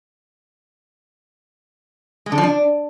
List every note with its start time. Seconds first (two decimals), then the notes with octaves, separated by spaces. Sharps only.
2.26 G#3
2.32 D3
2.38 F3
2.43 D4